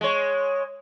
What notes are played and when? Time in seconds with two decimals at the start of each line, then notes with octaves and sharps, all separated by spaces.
0.01 G#3 C#5